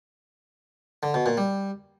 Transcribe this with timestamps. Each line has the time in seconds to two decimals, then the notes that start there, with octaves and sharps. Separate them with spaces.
1.03 D3
1.14 B2
1.26 A#2
1.37 G3